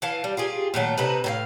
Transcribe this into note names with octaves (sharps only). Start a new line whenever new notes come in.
E3 F5 A5
G3
F4 G4 G#4
A#2 D#3 F#3 A3
C3 D#4 A4 B4
A2 G4 F5